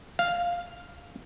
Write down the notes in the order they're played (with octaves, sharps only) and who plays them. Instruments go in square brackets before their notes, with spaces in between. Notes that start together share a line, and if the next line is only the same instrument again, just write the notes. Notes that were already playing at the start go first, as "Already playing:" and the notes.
[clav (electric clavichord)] F5